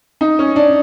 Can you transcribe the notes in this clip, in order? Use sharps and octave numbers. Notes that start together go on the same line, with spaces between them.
D#4
C#4
D4